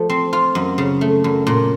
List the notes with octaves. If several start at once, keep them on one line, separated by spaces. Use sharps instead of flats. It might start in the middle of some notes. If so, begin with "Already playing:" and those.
Already playing: F3 A3
C4
F4
F#2
C#3
A3
F#2
A#2